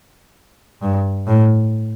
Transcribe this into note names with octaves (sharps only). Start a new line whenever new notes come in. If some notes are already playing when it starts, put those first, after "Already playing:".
G2
A2